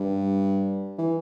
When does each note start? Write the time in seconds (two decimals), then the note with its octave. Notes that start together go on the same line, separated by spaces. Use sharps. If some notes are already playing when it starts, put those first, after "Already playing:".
Already playing: G2
0.98 E3